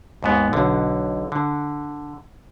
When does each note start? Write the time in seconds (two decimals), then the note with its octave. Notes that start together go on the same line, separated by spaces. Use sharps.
0.23 D#2 G#2 B3
0.53 B1 D3
1.32 D3